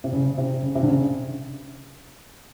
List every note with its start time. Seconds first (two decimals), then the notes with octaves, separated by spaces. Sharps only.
0.04 C3
0.13 C#3
0.25 C#3
0.38 C3
0.63 C#3
0.75 C3
0.83 D3
0.88 C#3